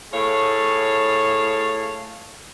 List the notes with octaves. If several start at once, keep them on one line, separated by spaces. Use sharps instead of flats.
A2 G#4 C#5 F5 A5